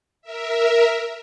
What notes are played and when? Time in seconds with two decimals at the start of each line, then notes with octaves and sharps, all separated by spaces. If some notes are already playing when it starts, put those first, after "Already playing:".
0.22 A#4 E5